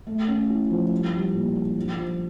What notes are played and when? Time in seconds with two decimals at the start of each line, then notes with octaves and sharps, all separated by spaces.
0.07 A3
0.28 C#4
0.50 E4
0.70 F3
0.91 G3
1.13 G3
1.34 A#2
1.55 D4
1.76 F3
1.98 F3